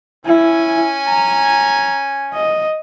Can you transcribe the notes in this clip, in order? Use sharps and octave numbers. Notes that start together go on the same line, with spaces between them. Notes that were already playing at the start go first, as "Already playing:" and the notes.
C#4 E4 G#5
A#5
D#5